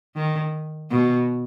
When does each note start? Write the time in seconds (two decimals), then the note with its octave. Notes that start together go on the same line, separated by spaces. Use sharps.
0.16 D#3
0.91 B2